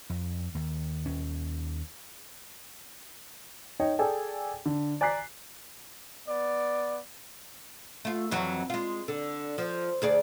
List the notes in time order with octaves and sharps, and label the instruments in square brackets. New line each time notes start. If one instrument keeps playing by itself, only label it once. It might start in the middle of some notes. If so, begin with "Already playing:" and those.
[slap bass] F2
D#2
D#2 C#4
[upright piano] D#4 C#5 D#5 G5
G#4 A4 D5 G5 G#5
D3
D5 G#5 A#5 F#6 B6 C7
[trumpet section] B3 D5
[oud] A3 F4
F2 E3 F#3
G#3 F4
D3
F3
D2 G#4 D5